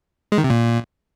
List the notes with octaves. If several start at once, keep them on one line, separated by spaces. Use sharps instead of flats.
G#3
D#3
C3
A#2